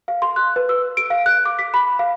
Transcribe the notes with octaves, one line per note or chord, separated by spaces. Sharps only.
F5
C6
F#6
B4
E6
D7
F5
F#6
D6
B6
B5
F5